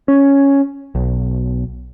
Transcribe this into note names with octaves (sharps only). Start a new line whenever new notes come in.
C#4
B1